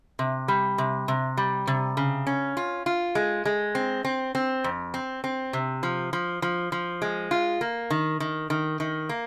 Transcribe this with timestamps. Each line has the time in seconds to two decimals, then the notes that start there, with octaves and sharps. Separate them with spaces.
0.19 C3
0.48 G3
0.78 C3
1.08 C3
1.37 G3
1.67 C3
1.97 C#3
2.27 C#4
2.57 F4
2.86 F4
3.15 G#3
3.45 G#3
3.75 C4
4.05 C4
4.35 C4
4.64 F2
4.94 C4
5.24 C4
5.53 C3
5.83 F3
6.13 F3
6.42 F3
6.72 F3
7.02 G#3
7.31 F4
7.61 A#3
7.90 D#3
8.20 D#3
8.50 D#3
8.80 D#3
9.09 A#3